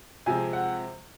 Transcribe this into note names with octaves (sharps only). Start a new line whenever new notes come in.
C3 F3 G#3 C4 G#5
F#5